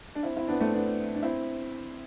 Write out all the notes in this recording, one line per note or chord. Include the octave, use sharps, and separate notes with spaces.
D4
C4 E4
C4 E4
B3 D4
A3 C4
B3 D4
D4
C4 E4